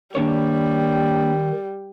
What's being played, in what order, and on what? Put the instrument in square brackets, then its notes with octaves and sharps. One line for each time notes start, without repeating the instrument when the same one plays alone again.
[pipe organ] D#3 [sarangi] G3 [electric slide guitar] A#3 D4 C#5